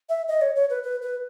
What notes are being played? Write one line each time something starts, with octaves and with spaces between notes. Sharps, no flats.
E5
D#5
C#5
C#5
B4
B4
B4